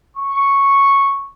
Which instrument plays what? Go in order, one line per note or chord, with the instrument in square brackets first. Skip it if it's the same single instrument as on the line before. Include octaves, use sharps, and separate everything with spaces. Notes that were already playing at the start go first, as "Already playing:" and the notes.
[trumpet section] C#6